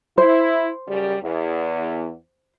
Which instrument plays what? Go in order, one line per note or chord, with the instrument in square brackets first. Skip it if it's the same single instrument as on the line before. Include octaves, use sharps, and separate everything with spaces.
[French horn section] E4 [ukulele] C5
[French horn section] F#2 C#3 G3
E2